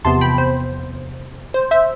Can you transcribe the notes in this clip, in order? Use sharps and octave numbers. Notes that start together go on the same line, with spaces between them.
E2 C3 F3 B3 A5 C6
G5 B5
C5
C5
C5 E5